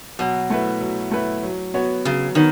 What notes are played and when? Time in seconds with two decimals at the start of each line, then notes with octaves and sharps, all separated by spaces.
0.19 B2 F#3
0.50 A3 E4 B4
0.81 F#3
1.12 A3 E4 B4
1.43 F#3
1.74 B3 F#4 C#5
2.05 C#3 F#3
2.35 D#3 B3 F#4 C#5